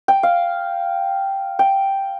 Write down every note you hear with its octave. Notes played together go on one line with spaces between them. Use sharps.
G5
F5
G5